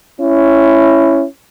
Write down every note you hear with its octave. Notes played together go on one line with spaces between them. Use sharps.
C#4 E4